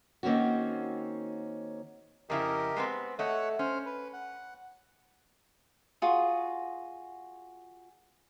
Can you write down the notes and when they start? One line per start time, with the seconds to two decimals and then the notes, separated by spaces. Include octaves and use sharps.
0.23 D#3 A#3 C4 C#4 F#4
2.30 F2 C#3 E4 G4 A#4 D#5
2.76 G#3 B3 C4
3.19 A3 C#5 D#5 F#5
3.59 C#4 C5 F6
3.86 B4
4.13 F#5
6.02 F4 F#4 G#4